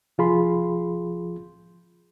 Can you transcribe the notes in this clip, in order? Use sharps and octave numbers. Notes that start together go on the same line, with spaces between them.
C2 F3 F4 G#4 B5 C6